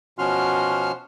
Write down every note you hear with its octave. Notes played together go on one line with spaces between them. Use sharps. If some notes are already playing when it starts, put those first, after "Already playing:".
B2 F3 C#4 F#4 C6 F6